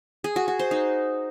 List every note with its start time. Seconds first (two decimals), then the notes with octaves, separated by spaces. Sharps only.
0.24 G#4
0.36 F#4
0.48 F#4
0.59 C5
0.71 D#4